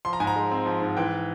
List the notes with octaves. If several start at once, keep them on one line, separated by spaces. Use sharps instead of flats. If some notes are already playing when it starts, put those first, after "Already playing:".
F3 C6
A#5
G#2 G#5
A#5
G#3
C4
F3
G#2
E3 G5